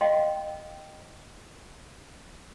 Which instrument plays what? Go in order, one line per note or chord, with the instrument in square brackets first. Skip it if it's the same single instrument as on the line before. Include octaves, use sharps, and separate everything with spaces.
[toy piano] D#5 F5 G5 C6